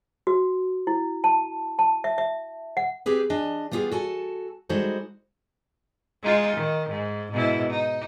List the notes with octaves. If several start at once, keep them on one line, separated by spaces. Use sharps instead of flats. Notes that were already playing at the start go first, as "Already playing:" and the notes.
F#4
E4
A5
A5
E5
E5
F#5
C4 G4 G#4 B4
D4 D#5 G#5
G3 B3 F4 G4 G#4
F#4 A4 G#5 A5
G3 G#3 D#4 F#4 A4 C5
G#3 D#4 F4
D#3
G#2
G#2 B2 E4
D#4